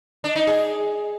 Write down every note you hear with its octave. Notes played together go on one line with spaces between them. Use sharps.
D4
D#4
G#4